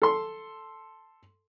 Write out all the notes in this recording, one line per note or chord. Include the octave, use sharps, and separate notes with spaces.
A4 C6